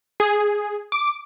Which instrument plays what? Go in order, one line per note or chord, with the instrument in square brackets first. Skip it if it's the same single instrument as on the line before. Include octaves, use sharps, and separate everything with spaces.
[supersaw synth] G#4
D6